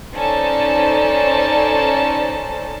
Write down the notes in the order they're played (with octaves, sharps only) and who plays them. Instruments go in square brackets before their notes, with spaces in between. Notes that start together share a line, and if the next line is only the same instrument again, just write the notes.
[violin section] C#4 D#4 A4 C5 D5 A5